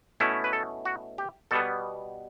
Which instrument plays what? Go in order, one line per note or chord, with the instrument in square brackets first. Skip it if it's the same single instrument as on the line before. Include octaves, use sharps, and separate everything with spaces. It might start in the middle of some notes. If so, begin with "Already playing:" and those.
[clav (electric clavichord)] B2 A3 C#4 E4
B4
A4
F#4
G4
B2 G3 B3 A4